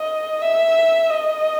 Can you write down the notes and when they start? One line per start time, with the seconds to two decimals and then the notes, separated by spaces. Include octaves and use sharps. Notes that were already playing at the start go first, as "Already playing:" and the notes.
Already playing: D#5
0.42 E5
1.10 D#5